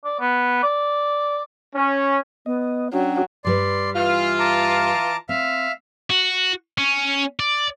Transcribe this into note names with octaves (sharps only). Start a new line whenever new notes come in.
D5
B3
D5
C#4
B3 D#5
F#3 C#4 D4 F#4 G5
G2 G3 B4 D5 C6
E3 F4 F6
A5 A#5 D6
C4 E5 F5
F#4
C#4
D5